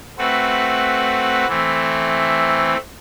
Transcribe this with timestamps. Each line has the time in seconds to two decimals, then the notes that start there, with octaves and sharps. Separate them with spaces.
0.18 A3 C4 F#4 B4
1.47 E3 A3 C4